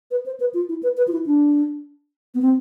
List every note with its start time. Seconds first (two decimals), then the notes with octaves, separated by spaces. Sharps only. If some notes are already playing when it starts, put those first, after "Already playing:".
0.11 B4
0.26 C5
0.40 B4
0.54 F4
0.69 E4
0.83 B4
0.97 B4
1.08 F4
1.12 E4
1.26 D4
2.35 B3
2.42 C4